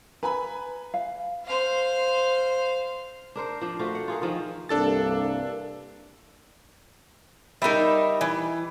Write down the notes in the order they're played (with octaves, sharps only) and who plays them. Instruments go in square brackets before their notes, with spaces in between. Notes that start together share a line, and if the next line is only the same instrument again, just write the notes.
[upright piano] B4 G#5 B5 [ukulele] A#5
[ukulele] F5
[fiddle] C5 F5
[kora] D4 A#4 C5
F3 D4
A3 F4 F#4 C5
F#5
F4 G#4 A#4
D#3 F3 F4
[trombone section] C2 G2 A#3 [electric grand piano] D4 A4 A6
[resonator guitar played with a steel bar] G3 A#4 [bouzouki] D#4 E5
[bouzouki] E3